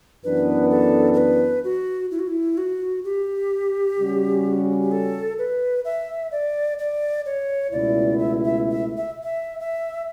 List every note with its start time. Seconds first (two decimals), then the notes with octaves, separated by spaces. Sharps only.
0.24 F#2 E3 B3 D4 B4
0.71 A4
1.13 A4
1.17 B4
1.64 F#4
2.11 E4
2.19 F#4
2.27 E4
2.58 F#4
3.04 G4
3.99 C#3 G3 C#4 F#4
4.83 G4
4.92 A4
5.38 B4
5.85 E5
6.32 D5
6.79 D5
7.26 C#5
7.72 C#2 B2 A3 E4 D5
8.19 E5
8.45 E5
8.71 E5
8.97 E5
9.23 E5
9.60 E5